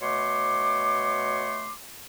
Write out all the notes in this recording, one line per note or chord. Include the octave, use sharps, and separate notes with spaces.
B2 A3 C#5 C6 D6